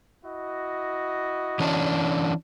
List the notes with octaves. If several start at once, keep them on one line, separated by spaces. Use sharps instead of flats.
E4 F#4 D#5
E3 C#4 D4